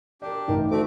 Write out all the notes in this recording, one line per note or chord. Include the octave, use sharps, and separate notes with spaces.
D4 G4 A#4 D5
A1 E3 D#4 A#4 G5
D2 A3 C4 D6